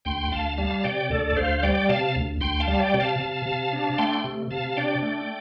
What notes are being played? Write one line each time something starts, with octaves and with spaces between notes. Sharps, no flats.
D2 G5 C6
D2 F5 A5
G3 F5 A5
C3 D5 G5
D2 A4 D5
D2 C5 F5
G3 D5 G5
C3 F5 A5
D2
D2 G5 C6
F5 A5
G3
D5 G5
C3
F5 A5
C3
C3
D4
A3 G5 C6
C3
C3 F5 A5
A5
D4 D5 G5
A3